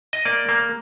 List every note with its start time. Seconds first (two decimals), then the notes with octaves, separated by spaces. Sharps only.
0.13 D#5
0.25 A#3 D5
0.49 A#3